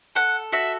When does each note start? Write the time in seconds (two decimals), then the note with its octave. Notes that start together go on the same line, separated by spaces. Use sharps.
0.15 A4 F#5
0.52 F#4 E5